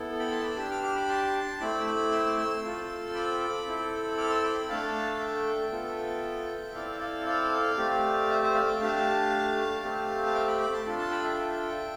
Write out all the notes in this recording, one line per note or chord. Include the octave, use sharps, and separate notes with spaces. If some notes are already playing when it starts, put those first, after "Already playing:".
Already playing: B3 E4 A4
G5 B5
A5 C6
E6
B5 D6
D4 G4 C6 E6
D6 F6
D6 F6
B5 D6
A5 C6
A3 C4 E4 B5 D6
E6
B5 D6
C6 E6
D6
C6 E6
C4 F4 A4
B5 D6
C4 E4 A4
D6 F6
C6 E6
B5 D6
G5 B5
A3 D4 A4 F5 A5
E5 G5
B3 F4 A4
C4 E4 A4 D5 F5
D5 F5
D5 F5
A3 C4 G4
C5 E5
C5 E5
D5 F5
E5 G5
A3 D4 G4 F5 A5
A3 C4 G4
A5
E5 G5
G5 B5
B5 D6
A5 C6
D4 F4 A4
A5 C6
G5 B5
E5 G5